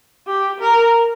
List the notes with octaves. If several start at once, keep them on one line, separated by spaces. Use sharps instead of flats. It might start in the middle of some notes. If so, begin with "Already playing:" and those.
G4
A#4